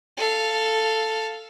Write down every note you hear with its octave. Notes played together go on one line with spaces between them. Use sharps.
A4 F5